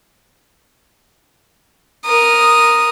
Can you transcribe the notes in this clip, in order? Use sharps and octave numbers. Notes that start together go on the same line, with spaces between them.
A#4 D#6